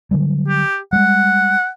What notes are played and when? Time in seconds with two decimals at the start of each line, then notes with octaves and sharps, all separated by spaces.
0.11 D3 F#3 G3
0.48 G4
0.93 G3 G#3 F#5